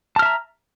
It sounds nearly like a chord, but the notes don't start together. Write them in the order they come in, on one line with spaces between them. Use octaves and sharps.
A5 F6 E5 A#5